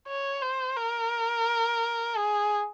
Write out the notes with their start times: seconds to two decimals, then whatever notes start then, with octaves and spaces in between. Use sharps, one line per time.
0.08 C#5
0.42 C5
0.77 A#4
2.17 G#4